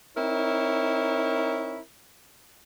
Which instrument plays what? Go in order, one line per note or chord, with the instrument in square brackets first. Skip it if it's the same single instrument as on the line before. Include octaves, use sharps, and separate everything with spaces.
[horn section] C4 D#4 E4 A#4 C#5